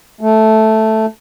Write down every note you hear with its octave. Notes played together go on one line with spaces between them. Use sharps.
A3